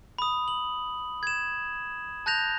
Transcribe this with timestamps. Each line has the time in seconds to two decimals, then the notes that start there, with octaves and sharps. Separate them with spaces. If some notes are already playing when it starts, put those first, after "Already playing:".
0.18 B5 D#6
0.48 F#7
1.23 G#6 E7
2.26 A5 F#6 G6 A#6 F7